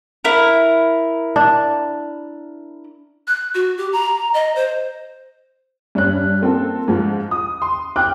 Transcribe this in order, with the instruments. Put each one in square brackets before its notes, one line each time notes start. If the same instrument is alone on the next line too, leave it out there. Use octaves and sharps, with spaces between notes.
[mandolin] E4 A#4
[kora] D4
[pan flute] F#6
F#4
G4
A#5
D#5
C5
[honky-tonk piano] G2 C#4 F#6
A#3 C4 F4 A4
G#2 F3
D#6
C6
G5 D6 F6 F#6